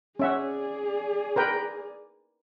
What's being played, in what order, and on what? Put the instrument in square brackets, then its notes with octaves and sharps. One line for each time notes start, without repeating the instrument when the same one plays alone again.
[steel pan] C#4 E5 F#5 [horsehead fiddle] G#4 D5
[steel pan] A#4 B4 G5